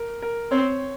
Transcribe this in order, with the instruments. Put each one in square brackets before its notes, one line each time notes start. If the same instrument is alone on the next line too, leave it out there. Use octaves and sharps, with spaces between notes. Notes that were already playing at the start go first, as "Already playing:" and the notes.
Already playing: [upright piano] A#4
A#4
[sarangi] C4 [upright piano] C#5